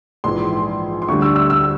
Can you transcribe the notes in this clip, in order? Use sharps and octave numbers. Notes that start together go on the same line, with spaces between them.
A#1 G#2 E3 C6
C6
D2 D3 G3 C#6
E6
E6
E6